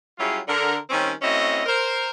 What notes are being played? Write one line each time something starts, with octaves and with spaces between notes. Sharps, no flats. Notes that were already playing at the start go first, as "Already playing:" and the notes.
F#3 G3 C#4 E4 F4 G#4
D3 A#4
D#3 G3 C4 C#4
A3 C4 C#4 E4 F#4 D#5
A#4 C5